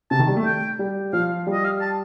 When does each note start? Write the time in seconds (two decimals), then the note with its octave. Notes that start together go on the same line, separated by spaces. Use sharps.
0.11 C3 A5
0.19 D#3
0.28 G3
0.36 A3
0.46 G5
0.79 G3
1.13 F3 F5
1.47 G3
1.53 D#5
1.64 F5
1.81 A5